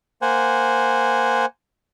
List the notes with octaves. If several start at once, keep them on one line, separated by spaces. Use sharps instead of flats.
A#3 C5 F#5 G#5